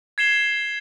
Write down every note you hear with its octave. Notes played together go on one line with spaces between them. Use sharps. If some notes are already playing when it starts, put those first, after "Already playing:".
G#6 C7 E7 G7